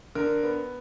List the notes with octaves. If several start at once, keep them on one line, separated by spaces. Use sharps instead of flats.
D3 A#4
B3